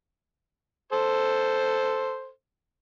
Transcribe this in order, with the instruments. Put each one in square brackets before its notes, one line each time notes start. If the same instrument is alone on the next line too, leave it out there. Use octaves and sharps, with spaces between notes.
[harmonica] A4 C5